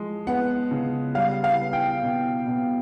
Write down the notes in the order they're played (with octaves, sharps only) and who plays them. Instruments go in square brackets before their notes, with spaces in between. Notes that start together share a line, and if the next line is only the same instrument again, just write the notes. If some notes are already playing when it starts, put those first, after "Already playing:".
Already playing: [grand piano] F3 G#3
B3 F#5
C#3
G3 F5
F5
B3
G5
B2
B2